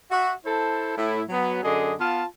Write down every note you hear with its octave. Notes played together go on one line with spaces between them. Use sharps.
F#4 E5
E4 A4 C5 A5
A2 E4
F#3 B3
F#2 D3 G#4 D#5
B3 F4 F5 A5